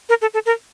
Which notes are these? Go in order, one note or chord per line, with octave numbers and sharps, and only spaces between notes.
A#4
A4
A4
A#4